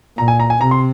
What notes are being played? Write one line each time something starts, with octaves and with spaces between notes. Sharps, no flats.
A#2 A#5
G#5
A#5
G#5
C3 A#5
C6